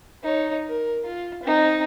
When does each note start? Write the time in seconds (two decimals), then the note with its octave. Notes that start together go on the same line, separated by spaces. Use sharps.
0.23 D#4 C#5
0.67 A#4
1.05 F4
1.43 C4 D#4